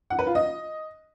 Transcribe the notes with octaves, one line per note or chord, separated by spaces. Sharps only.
F#5
B4
F4
D#5